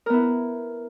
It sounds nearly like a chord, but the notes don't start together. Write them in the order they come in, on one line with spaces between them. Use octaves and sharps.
A#4 B3 E4